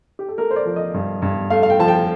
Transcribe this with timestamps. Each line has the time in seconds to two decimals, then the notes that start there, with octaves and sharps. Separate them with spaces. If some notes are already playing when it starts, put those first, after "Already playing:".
0.19 G4
0.29 A4
0.38 A3 A#4
0.51 C5
0.56 D5
0.66 F3
0.76 D#5
0.94 G2
1.22 G2
1.50 A3 F5
1.63 F5
1.70 G5
1.79 F3 A5
1.88 G5